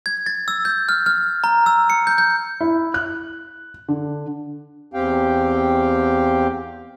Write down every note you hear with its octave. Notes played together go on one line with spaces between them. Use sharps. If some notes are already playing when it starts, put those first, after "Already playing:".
G#6
A6
E6
G6
F6
F6
A#5
E6
C#7
G6
G6
E4
F#6
D3
E2 C4 G4 F5 G5